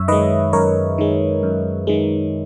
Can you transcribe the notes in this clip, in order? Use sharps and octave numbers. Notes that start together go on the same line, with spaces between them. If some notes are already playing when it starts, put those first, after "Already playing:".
Already playing: F#2 C#5 E5
D#3 G#3 B4 D#5
F#2 A#4 C#5
D#3 G#3
F#2
D#3 G#3